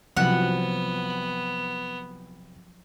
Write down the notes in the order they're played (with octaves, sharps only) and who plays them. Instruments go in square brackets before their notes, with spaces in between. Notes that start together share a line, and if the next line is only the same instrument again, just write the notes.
[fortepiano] C2 [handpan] F3 F#3 [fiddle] B3 [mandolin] F#5